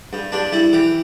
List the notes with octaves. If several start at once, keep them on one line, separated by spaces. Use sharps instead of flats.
G2
G2 D4
G3 E4
E3 G4